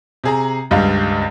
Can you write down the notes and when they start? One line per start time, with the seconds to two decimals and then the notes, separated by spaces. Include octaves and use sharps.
0.24 C3 G#4 A#5
0.71 D#1 C#2 G2 G3 F5